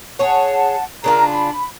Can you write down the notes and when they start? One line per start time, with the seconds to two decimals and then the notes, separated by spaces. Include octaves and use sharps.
0.19 G#4 C#5 F#5 A5
1.04 C#3 D4 F4 A#4 A#5
1.30 B5